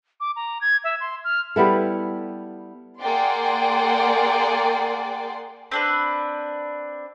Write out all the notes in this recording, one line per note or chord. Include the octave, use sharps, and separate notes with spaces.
D6
A#5
G#6
E5
C6
F6
G3 B3 E4 A4
A#3 G#4 D5 F#5 G5 C6
C4 D4 B4